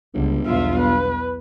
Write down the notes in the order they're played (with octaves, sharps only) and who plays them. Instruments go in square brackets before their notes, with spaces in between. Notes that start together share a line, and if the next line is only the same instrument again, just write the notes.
[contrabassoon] G1 [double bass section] C#2 D3
[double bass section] B1 E2 [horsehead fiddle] F4 E5
[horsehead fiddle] B4